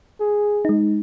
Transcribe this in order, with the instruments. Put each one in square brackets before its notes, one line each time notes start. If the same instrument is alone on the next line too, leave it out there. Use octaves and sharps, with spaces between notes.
[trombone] G#4
[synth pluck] G#3 D#4